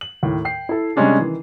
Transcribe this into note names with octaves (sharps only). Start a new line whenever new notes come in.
F#7
D#2 A2
G5 C7
E4 A4
C3 G3 G#3 C#4 D4 G#4
D#3 E3